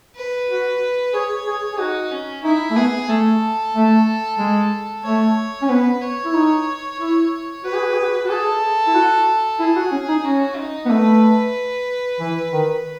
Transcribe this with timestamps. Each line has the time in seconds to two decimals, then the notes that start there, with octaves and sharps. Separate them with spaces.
0.16 B4
0.49 F#4
1.14 G#4 C#5
1.46 G#4
1.73 G#4
1.79 D#4 F#4
2.12 C#4
2.44 D#4 E4
2.70 A3
2.76 B3 G#4
3.08 A3 A4
3.74 A3
4.38 G#3
5.04 A3 C#5
5.62 C#4
5.69 B3 B4
6.01 C#5
6.25 E4
6.34 D#4
6.99 E4
7.64 F#4 B4
7.75 G#4
7.84 F#4
7.94 G#4
8.04 F#4
8.25 F#4
8.29 G#4 A4
8.87 E4
8.94 F#4
9.59 E4 G#4
9.76 F#4
9.92 C#4
10.09 D#4
10.25 C#4 F#4
10.57 D#4
10.86 B3
10.90 A3 B4
12.20 E3
12.53 D#3